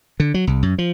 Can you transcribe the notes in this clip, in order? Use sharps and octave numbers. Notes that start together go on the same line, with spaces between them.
D3
F#3
C2
F#2
F3